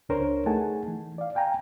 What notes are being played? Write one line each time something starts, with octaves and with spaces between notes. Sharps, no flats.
C#2 D4 A#4 C5 C#5
A3 D#4 G#4 F#5 G#5 A5
E3
D5 F5
F5 G5 G#5 A#5